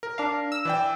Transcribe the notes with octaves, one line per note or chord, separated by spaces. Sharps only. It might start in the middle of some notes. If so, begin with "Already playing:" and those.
A#4
D4 F5
E6
E3 D5 G5